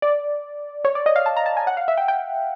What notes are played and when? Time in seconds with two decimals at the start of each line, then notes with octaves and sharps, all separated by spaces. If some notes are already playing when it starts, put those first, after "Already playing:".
0.02 D5
0.85 C#5
0.95 D5
1.06 D#5
1.16 F5
1.26 A5
1.37 A#5
1.46 A5
1.57 G#5
1.67 F#5
1.77 F5
1.88 E5
1.97 G5
2.08 G5